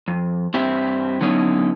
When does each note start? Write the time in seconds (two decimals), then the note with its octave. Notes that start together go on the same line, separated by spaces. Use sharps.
0.08 F2
0.54 G2 C4 E4 G4
1.21 D3 F#3 B3 C#4 D#4 E4